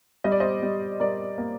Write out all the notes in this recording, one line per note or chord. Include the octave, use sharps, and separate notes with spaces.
G3 D#5
D5
C5 D#5
G3
G3 A#4 D5
A#3